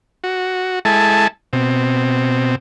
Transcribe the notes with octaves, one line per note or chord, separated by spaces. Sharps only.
F#4
G#3 E4 A4 G#5 A5
B2 C4